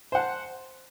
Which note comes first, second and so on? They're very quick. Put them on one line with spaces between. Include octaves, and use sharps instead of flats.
C5 F#5 A5